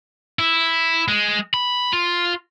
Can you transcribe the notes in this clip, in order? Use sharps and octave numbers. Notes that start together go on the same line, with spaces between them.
E4
G#3
B5
F4